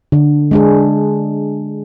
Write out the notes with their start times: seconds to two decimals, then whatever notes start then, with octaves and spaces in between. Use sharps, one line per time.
0.12 D3
0.51 G#3 D4 G#4